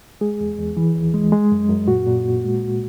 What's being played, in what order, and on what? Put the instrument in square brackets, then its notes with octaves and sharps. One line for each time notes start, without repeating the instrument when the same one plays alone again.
[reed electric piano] G#3 G#4
E2
E2
E3
D#2
G#3
G#3
F#2
F#2
A#2 F#4
A#2
A#3
G#3
C#2